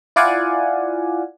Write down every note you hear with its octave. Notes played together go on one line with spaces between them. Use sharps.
E4 F4 D5 F5 F#5 G#5